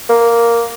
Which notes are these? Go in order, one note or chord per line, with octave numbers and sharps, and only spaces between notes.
A#3